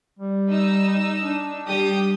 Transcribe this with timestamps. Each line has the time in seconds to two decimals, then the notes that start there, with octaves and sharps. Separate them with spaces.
0.19 G3
0.49 D#4 E6
1.21 D4
1.66 G3 G4 D#6